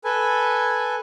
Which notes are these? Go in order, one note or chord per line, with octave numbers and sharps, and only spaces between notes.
A4 B4 G#5